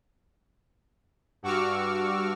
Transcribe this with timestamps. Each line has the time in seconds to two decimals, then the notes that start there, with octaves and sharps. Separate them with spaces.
1.43 G2 F#4 C#6 D6 E6 F6